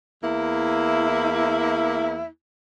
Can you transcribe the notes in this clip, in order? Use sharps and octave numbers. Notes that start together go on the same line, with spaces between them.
E2 A#3 E4